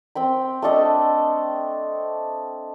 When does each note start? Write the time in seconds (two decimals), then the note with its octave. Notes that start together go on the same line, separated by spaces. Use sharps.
0.15 C4 G5 B5
0.62 A3 D4 A4 D#5